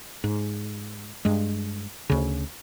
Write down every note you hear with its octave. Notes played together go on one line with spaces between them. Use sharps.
G#2
G2 G#3
D2 C#3